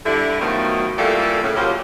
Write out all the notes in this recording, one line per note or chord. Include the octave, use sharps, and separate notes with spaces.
D3 G3 E4
B2 D#3 F3 F#3 A3
E3 G3 A3 A#3 F4 A4
A2 C#3
C#3 F3 F#3 A#3 G4